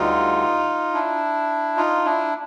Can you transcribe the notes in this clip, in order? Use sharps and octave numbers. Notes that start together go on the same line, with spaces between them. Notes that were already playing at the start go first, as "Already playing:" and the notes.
Already playing: D2 D3 G3 D#4 F4
D4 E4
D#4 F4
D4 E4